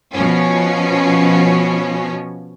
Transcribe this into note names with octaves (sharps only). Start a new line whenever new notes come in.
B2 F3 C#4